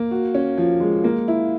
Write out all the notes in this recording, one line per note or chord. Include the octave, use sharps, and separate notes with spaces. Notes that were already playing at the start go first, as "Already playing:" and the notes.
Already playing: A#3
F#4
C#4
F3
G#3
A#3
E4